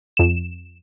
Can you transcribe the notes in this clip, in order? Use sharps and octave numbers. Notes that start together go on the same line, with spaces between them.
F2 E7